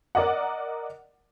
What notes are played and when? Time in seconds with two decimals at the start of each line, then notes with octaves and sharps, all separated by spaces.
0.15 A#4 D5 D#5 F#5